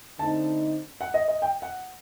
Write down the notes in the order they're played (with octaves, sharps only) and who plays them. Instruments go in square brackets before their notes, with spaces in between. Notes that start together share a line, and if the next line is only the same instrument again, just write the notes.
[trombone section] D3 A3 C4 D#4 [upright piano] A5
[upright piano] F#5
D#5
D#5
G5
F#5